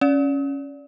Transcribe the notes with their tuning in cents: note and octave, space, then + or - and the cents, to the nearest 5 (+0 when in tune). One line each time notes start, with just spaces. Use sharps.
C#4 +0 D5 -20